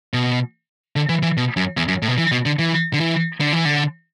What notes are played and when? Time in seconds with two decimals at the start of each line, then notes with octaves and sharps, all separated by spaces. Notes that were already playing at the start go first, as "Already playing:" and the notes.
0.14 B2
0.96 D3
1.09 E3
1.23 E3
1.37 B2
1.57 F#2
1.77 E2
1.88 F#2
2.02 A2
2.08 B2
2.18 E3
2.32 B2
2.46 D3
2.59 E3
2.93 D3
3.00 E3
3.41 D3
3.53 E3
3.65 D3